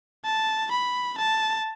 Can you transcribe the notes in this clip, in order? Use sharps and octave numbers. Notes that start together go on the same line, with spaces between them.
A5
B5
A5